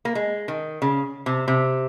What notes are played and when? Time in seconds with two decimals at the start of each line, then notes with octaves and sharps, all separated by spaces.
0.05 A#3
0.15 G#3
0.48 D#3
0.82 C#3
1.26 C3
1.48 C3